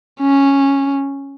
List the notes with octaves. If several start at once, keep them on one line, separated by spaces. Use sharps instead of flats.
C#4